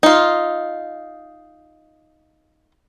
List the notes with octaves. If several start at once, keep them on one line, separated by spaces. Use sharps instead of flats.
D#4 F4